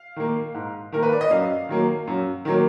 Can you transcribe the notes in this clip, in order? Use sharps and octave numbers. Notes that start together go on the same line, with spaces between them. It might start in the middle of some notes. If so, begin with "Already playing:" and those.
Already playing: F5
D#3 A#3
G#2
D#3 A#3 A#4
B4
D5
D#5
F#2 F5
D#3 F#3 A#3
F#2
D#3 F#3 A#3